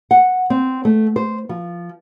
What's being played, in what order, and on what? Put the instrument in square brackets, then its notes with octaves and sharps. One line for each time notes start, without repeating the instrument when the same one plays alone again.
[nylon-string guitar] F#5
C4
A3
C5
F3